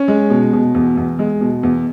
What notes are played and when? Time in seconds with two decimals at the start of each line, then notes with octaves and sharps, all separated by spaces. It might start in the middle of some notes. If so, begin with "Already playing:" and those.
Already playing: C#4
0.08 G#3
0.30 B2
0.53 B2
0.75 E2
0.97 E2
1.19 G#3
1.41 B2
1.63 E2